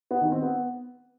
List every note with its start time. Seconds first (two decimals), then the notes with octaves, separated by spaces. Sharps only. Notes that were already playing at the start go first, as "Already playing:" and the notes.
0.11 B3
0.21 D#3
0.32 C4
0.42 B3